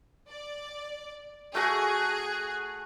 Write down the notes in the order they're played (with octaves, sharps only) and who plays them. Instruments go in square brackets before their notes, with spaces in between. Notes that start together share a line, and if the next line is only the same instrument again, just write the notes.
[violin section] D5
[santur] A3 F#4 [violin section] G#4